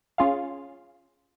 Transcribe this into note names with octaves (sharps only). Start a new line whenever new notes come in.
C#4 F4 G#4 F5